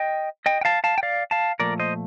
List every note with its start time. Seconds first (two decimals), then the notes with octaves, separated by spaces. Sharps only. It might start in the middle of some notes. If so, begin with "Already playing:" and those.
Already playing: D#5 G5
0.46 D#5 G5
0.61 G5
0.65 F5 A5
0.84 F5 A5
0.98 G5
1.03 D5 F5
1.31 F5 A5
1.60 A#2 F3 A3 A#4 D5
1.79 C5 D#5